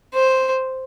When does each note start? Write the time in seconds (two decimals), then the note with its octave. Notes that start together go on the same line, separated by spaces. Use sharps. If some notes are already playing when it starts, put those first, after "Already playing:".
0.15 C5